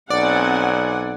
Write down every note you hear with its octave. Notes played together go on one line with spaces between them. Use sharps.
B1 C4 D5 F#5 G#5